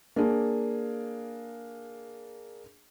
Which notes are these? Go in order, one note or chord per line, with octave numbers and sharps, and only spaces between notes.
A#3 D4 G#4